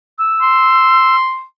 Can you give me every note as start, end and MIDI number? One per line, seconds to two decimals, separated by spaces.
0.18 1.15 88
0.42 1.43 84